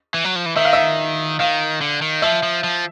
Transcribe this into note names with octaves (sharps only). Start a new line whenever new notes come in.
E3
F#3
F3
E3
D#3 E5
F5
E5
D#3 F5
D3
D#3
F3 E5
F3
F3